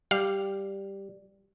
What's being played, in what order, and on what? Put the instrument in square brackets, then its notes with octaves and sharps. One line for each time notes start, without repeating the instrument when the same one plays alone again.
[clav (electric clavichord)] G3 [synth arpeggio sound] F5